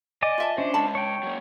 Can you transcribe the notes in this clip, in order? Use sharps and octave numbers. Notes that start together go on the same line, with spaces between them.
D5 D#5 G#5 D6
F4 E5 A5
C#4 D4 C5
C#3 G#3 A5 B5
C#5 G5
F#3 A#3